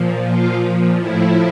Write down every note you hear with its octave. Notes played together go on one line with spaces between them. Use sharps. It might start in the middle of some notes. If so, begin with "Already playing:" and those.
Already playing: A#2 F3
F4
A2 F3 E4